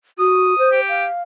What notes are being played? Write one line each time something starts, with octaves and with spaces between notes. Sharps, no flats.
F#4 D#6
C5
G4
F5